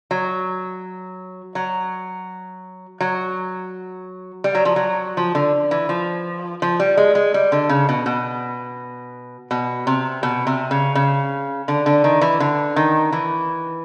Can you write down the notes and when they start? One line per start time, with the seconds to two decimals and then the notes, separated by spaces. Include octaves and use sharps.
0.11 F#3
1.55 F#3
3.00 F#3
4.44 G3
4.55 F#3
4.65 F3
4.76 F#3
5.17 F3
5.35 D3
5.71 E3
5.89 F3
6.62 F3
6.80 G3
6.97 G#3
7.15 G#3
7.34 G3
7.52 D3
7.69 C#3
7.89 B2
8.06 B2
9.51 B2
9.87 C3
10.23 B2
10.47 C3
10.71 C#3
10.95 C#3
11.68 D3
11.86 D3
12.04 D#3
12.21 E3
12.40 D3
12.76 D#3
13.12 E3